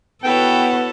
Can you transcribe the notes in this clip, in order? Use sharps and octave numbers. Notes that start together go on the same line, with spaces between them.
B3 E4 F#4 A4 B4 C#5 G5